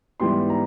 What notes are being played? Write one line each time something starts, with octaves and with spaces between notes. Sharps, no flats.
G#2 E3 G3 B3 C6
A#5